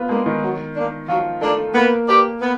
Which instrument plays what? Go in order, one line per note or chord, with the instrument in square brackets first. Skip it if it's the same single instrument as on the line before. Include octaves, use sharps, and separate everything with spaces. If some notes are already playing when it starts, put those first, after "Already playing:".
Already playing: [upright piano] B3 F4 B4
[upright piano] G#3 G#4 [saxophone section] A#3 D4
[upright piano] D#3 D#4
[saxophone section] F#3
A#3 D4
[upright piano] F3 F4 [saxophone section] F#3
[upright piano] A3 A4 [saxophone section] A#3 D4
[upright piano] A#3 A#4 [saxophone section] B3
[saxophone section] D4 G4 B4 D5
B3